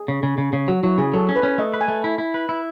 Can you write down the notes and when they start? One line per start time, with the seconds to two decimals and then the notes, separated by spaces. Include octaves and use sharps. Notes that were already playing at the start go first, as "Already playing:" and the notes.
Already playing: G#4
0.08 C#3
0.23 C#3
0.38 C#3
0.53 C#3
0.68 F#3 F#4
0.83 F#3 E4
0.98 C#3 G#4
1.14 F#3 A4
1.29 C#4
1.36 B4
1.43 C#4
1.58 A3 D#5
1.74 B4
1.81 G#5
1.88 A3
2.04 E4
2.18 E4
2.34 B4
2.49 E4